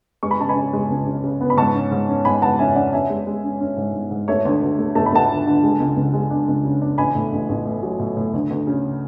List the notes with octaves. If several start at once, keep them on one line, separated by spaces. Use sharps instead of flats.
G#3 C#6
B5
C#3 A5
G#5 B5
C#3
G#3
C#2
C#3
C#3
B3
B5
G#2 A5 C#6
C#4
G#2
C#4
G#2 G#5 B5
G#2 F#5 A5
C#4 E5 G#5
C#4 D5 F#5
C#4 E5 G#5
G#3
G#3
C#4
C#4
G#2
G#2
G#2
A3 C#5 E5
D2
D2
A3
A3 A5
B5
A3 F#5 A5
D3
D3
G#3
C#2
C#2
G#3
D4
C#2
C#3
D4
A1 G#5 B5
A2
A1
A1
A2
F#3
A2
A2
D2
D2
C#3